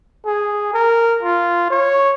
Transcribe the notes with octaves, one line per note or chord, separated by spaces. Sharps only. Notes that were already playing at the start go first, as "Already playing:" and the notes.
G#4
A#4
F4
C#5